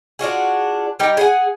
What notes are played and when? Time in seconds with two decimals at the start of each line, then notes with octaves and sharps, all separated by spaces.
0.19 D4 F4 F#4 G#4
0.99 G3 D#4 G4
1.17 G#4 F#5 G#5